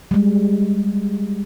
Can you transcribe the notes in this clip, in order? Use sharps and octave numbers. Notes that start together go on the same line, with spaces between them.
G3 G#3